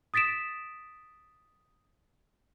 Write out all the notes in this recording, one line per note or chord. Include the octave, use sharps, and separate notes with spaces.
D#6 A6 B6 D7 E7